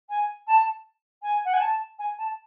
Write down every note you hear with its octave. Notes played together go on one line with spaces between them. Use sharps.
G#5
A5
G#5
F#5
G#5
A5
G#5
A5